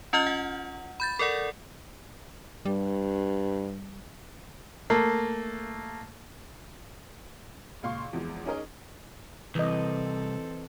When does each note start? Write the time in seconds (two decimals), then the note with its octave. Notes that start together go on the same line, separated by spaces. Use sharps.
0.13 C#4 F4 D#5 F6 G6 F#7
0.27 F#5
1.00 B5 G6 A6
1.19 A4 A#4 D5 F#5
2.65 G2 G3
4.90 A3 A#3
7.83 C#2 A#2 F5 C6 C#6
8.13 E2 E3 F3 G#3
8.46 C#4 D#4 G#4 A#4 D#5
9.55 C2 E3 C4 A4 D#5